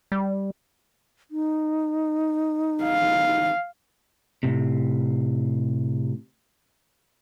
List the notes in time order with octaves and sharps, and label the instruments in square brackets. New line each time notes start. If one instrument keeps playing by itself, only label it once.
[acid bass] G3
[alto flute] D#4
[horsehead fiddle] F5
[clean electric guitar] A2 C3